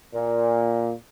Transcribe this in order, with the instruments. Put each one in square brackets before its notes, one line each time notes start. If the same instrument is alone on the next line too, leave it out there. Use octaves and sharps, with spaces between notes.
[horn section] A#2